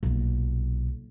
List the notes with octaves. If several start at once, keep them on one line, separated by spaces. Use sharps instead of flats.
B1 A#2